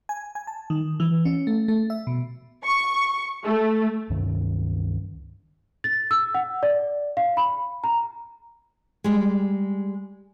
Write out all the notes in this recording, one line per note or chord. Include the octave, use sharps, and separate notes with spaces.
G#5
G#5
A5
D#3
E3
C#4
A3
A3
E5
B2
C#6
A3
C#2 G2 D#3 C#4
A6
E6
F#5
D5
F5
B5
A#5
G3 G#3